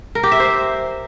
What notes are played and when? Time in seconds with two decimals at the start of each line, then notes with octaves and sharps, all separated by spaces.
0.15 A#4
0.23 G4
0.32 E5
0.40 C5